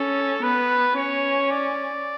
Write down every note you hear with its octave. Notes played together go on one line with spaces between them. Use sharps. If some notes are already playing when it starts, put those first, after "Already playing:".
Already playing: C#4 A4
B3 B4
C#4 C#5
D5